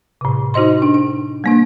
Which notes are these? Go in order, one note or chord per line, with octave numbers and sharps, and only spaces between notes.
A2 C3
D#4 F#4 C5 D#5 C6
D4
D4
G3 A#3 D4